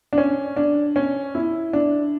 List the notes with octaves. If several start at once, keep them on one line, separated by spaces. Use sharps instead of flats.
D4
C#4
D4
C#4
E4
D4